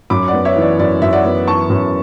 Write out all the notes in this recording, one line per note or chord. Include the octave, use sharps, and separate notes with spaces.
F#2 B5 D6
D5 F#5
B3
C#5 E5
E3
D5
F#2 D5
F#2 E5
D5 F#5
B3
E3 A5 C#6
F#2